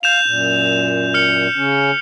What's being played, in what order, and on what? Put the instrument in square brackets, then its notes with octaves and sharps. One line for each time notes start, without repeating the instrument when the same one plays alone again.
[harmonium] F5 [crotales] G6 E7 F7
[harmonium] F#2 A#2
[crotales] F6 C#7
[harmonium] C#3 C#4